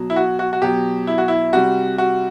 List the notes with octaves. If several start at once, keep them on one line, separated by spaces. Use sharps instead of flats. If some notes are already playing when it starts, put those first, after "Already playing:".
Already playing: B2 F#3
E4
F#4
F#4
F#4
B2 F#3 G4
E4
F#4
E4
C3 G3 F#4
F#4